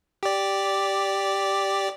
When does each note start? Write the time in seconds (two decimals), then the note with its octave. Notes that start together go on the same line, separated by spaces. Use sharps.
0.23 G4 D5